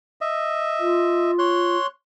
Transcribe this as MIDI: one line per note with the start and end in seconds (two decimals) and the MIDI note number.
0.21 1.31 75
0.21 1.31 76
0.80 1.77 65
1.39 1.87 73
1.39 1.87 84
1.39 1.87 90